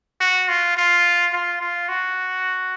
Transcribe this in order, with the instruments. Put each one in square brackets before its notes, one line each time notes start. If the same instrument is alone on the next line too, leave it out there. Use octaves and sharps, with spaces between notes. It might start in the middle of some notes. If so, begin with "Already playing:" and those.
[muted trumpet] F#4
F4
F4
F4
F4
F#4